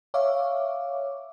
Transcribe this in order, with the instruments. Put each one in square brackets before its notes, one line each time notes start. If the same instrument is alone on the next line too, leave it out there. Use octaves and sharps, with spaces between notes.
[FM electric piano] C#5 E5 F5 D6